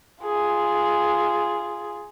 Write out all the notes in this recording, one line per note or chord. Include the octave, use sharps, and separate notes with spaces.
F4 G#4